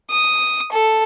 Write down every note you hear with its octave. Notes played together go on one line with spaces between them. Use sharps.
D#6
A4